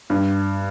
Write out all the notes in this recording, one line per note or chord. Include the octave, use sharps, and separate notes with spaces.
G2